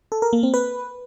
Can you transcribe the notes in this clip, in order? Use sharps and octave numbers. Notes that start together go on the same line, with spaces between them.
A4
A#4
A#3
C4
B4